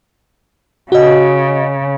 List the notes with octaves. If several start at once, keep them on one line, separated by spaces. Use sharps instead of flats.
C#3 F#4 D#5